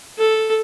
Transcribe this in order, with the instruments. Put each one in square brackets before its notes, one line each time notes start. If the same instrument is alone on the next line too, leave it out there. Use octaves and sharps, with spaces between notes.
[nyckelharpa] A4